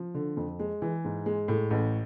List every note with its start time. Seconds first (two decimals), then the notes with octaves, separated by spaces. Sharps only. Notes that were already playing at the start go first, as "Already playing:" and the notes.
Already playing: F3
0.14 D3
0.37 F2
0.59 G#3
0.82 E3
1.05 G#2
1.26 G#3
1.48 A2
1.71 A1